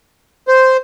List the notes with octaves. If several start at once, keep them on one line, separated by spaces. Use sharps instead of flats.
C5